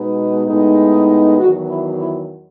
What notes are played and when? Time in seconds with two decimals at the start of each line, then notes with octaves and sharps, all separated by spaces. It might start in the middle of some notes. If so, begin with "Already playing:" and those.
Already playing: B2 G#3 B3 D#4
0.46 A2 G#3 B3 D#4
1.38 E2 D#3 F#3 F#4
1.70 E4
2.00 E4